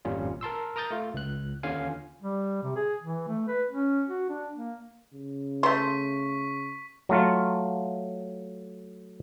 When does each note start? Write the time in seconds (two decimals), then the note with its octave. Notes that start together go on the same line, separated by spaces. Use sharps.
0.05 G#1 F2 A#2 G3 C#4 F4
0.41 A#4 A5 C6 E6
0.76 A#4 A#5 D#6 G6 A6
0.91 A3 F4
1.14 C#2 F#6
1.63 D#2 D3 C#4 F4 F5 G#5
2.22 G3
2.63 C3
2.76 G#4
3.02 E3
3.28 A3
3.48 B4
3.69 C#4
4.08 F#4
4.29 D4
4.55 A#3
5.14 C#3
5.63 A3 C6 C#6 B6
7.09 F#3 A3 F4